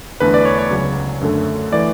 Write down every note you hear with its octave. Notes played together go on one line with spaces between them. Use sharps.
E2 D3 A3 B4
D5
C#5
C#5
C#2 C#3 F#3
F#2 D3 A3
E3 A3 D5